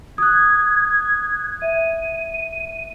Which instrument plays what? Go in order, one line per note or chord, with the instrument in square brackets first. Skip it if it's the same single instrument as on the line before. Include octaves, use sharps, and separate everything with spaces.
[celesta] D#6 F#6 [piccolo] G#6
[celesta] E5 [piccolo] D#7